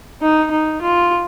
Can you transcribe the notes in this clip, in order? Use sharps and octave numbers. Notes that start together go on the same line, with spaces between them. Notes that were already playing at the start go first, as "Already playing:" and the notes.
D#4
D#4
F4